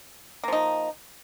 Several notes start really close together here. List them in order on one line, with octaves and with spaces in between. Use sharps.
A#3 F3 D#4